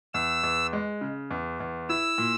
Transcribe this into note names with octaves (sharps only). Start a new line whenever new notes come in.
E2 E6
E2
G#3
C#3
E2
E2
E4 E6
A#2